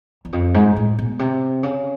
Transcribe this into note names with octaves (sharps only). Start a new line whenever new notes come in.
E2
F2
G#2
A2
B2
C3
C#3